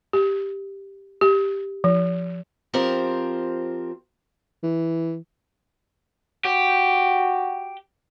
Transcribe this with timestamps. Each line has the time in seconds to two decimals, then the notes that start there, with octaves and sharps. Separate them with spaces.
0.13 G4
1.21 G4
1.84 F3
2.73 F3 C4 G4 A#4 C5
4.63 E3
6.45 F#4 G4